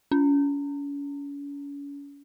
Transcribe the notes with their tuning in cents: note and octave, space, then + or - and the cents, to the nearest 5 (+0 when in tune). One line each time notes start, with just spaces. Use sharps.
C#4 +40